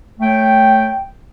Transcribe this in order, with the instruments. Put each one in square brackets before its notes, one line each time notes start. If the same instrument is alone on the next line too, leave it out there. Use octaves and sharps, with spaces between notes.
[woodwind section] A3 C#5 G5